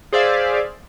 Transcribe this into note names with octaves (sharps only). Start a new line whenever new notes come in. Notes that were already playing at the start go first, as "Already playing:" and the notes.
G#4 C5 D5 E5 F5